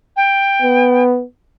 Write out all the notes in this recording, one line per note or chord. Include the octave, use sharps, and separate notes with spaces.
G5
B3